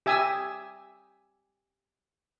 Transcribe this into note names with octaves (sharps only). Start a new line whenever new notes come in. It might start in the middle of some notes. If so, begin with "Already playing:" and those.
G4 E5 G#5 D#6 E6